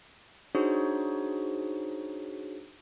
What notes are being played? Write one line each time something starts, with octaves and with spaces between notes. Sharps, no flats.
D4 D#4 F#4 G#4 C5 C#5